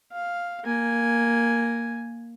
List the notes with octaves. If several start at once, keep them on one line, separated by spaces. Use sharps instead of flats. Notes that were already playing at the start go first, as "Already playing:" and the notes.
F5
A#3 G#5